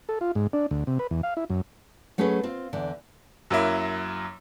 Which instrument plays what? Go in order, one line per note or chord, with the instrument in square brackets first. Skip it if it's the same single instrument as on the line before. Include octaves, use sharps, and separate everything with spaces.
[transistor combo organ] A4
F4
G#2
D4
D2
C3
B4
E2
F5
E4
F#2
[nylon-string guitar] F#3 A3 C#4 E4 G#4 B4
C4 F4
E2 D3
[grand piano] F#2 F#3 A#3 E4